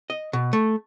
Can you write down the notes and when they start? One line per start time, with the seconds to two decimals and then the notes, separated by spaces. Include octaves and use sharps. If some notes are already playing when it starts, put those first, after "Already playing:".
0.10 D#5
0.33 B2
0.53 A3